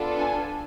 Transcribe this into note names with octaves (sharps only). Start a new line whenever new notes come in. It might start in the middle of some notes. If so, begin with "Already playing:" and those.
Already playing: B3 D4 F4 A4
G#5